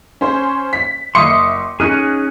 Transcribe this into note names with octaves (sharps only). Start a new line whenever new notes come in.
C#4 C5
B6
F#1 E5 C6 D6 D#6 C#7
C#4 D#4 G#4 F6 F#6